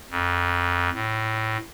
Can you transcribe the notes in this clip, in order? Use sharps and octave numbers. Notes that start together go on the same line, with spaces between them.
F2
A2